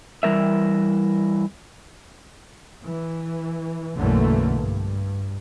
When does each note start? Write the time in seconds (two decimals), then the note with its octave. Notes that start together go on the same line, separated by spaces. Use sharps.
0.23 E3 G3 A#4 E5
2.85 E3
3.95 B1 F#2 D3 E3 A3 A#3
4.56 G2